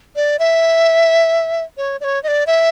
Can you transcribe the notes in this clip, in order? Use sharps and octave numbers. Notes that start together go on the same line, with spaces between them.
D5
E5
C#5
D5
C#5
D#5
D5
E5